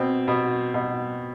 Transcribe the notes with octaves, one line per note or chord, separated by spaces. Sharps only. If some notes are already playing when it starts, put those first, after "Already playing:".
Already playing: B2 C4
B2
B2